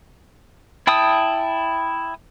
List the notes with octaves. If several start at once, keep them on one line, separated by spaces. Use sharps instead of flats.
E4 G5 A5 D#6 E6